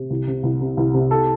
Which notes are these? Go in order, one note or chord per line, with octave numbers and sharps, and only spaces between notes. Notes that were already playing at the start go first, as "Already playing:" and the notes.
Already playing: C3
C2
C3
C2
C3
C2
C3
A4